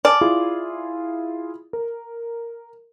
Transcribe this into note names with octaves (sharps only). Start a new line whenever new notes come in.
D5 G#5 A5 F6
E4 F4 G#4
A#4